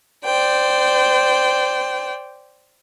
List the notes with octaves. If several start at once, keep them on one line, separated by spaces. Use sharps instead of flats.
C5 D5 G5